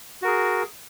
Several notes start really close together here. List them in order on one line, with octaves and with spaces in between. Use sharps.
F#4 A#4 G#4